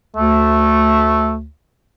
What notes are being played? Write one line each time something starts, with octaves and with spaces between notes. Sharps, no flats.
D2 A3